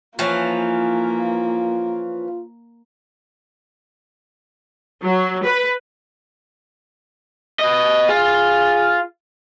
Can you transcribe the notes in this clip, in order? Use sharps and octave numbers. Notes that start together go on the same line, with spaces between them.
E3 F3 A#3 C#4 F4
F#3
B4
B4 D#5
F4 G#4